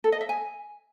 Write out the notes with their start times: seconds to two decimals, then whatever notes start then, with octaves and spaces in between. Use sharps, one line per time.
0.04 A4
0.12 D#5
0.21 E5
0.29 G#5